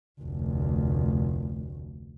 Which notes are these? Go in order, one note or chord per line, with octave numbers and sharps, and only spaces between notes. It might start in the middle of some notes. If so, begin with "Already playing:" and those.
F1 D2